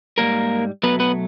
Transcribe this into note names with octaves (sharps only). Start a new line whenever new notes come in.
G#2 D#3 G3 A#3 A#4
B2 F#3 A3 B3 B4
B3 B4